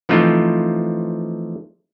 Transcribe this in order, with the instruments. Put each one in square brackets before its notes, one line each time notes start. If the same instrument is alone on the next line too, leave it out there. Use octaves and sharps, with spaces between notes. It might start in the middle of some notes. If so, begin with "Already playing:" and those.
[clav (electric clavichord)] E3 F3 A3 C4 D#4 F4